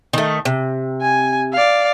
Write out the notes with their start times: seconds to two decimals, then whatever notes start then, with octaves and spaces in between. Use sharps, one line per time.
0.13 D#3 A3
0.45 C3
1.01 G#5
1.53 D5 F5